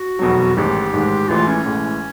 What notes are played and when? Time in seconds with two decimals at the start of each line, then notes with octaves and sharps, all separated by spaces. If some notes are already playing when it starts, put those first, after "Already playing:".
Already playing: F#4
0.19 F1 E2 B2 F#3
0.57 A1 G#2 D#3 G#3 G4
0.93 A1 G#2 D#3 G#3
1.29 A1 A2 E3 G#3 F4
1.47 C#4
1.65 A1 A2 E3 G#3